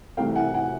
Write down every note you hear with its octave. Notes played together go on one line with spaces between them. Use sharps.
C2 C3 E3 A3 F5 G5
F#5 G#5
F#5 G#5